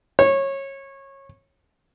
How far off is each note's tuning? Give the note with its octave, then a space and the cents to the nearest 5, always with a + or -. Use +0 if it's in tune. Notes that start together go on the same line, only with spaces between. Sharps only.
C#5 -20